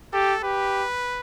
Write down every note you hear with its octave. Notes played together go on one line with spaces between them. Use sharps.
G4 A4
G4 B4